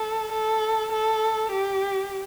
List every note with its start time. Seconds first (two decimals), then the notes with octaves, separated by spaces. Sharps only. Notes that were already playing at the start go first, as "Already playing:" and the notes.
Already playing: A4
0.32 A4
0.92 A4
1.52 G4